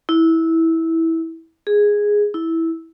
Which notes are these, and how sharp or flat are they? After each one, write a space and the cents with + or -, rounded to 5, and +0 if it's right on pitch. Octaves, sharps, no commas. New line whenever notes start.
E4 -15
G#4 -5
E4 -10